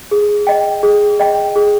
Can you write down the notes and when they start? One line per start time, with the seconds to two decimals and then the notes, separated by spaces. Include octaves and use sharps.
0.11 G#4
0.47 D#5 G5
0.83 G#4
1.20 D#5 G5
1.56 G#4